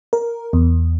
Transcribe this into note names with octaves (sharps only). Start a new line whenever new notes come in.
A#4
E2